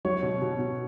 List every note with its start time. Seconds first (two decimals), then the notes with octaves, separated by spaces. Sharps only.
0.05 F#3 C#5
0.22 B2
0.42 B2
0.59 B2